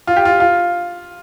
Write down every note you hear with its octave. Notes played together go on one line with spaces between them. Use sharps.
F4
G4
F4
F4